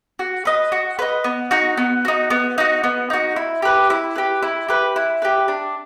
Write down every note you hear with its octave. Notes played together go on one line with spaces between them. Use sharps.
F#4
B4 D#5
F#4
B4 D#5
B3
D#4 F#4
B3
D#4 F#4
B3
D#4 F#4
B3
D#4 F#4
E4
G4 B4
E4
G4 B4
E4
G4 B4
E4
G4 B4
D4